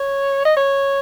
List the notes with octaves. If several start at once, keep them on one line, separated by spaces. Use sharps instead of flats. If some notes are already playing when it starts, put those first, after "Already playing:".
Already playing: C#5
D#5
C#5